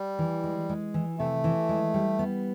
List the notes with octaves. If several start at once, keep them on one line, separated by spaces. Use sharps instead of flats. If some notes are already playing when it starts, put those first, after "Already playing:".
Already playing: G3
E3
G#3
G#3
E3
C3 A3
E3
G#3
G3
B3